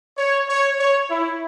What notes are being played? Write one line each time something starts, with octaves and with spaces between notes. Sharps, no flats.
C#5
C#5
C#5
E4